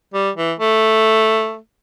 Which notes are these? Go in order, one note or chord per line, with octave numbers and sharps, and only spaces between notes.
G3
E3
A3